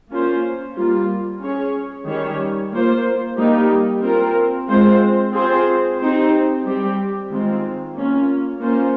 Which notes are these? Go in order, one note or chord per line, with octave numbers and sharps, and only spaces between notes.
A#3 C#4 F4 C5
G3 A#3 F4
C#4 G#4 C#5
D#3 G3 C#4 G4 C#5
A#3 F4 C5
G3 A#3 D#4 G4
C4 F4 A#4
G#3 C4 F4 C5
C4 F4 G#4 C5
C4 D#4 G4 C5
G3 C4 G4
D#3 G#3 C4 F4
A#3 C#4 F4
A#3 C#4 F4 C5